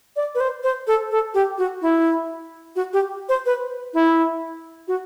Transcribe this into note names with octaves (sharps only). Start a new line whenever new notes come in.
D5
B4
C5
C5
A4
A4
G4
F#4
E4
F#4
G4
C5
B4
E4
F#4